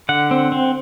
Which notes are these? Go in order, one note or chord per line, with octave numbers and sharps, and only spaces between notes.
D3 F#5
C4
C4